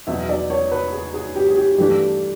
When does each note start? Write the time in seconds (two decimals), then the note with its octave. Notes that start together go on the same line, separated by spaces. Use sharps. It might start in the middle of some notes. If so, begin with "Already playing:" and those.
0.07 E2 B2 F#3 E5
0.29 D5
0.50 C#5
0.71 B4
0.92 G#4
1.14 G#4
1.35 G4
1.50 G#4
1.57 G4
1.78 G2 E3 A3 D4 G4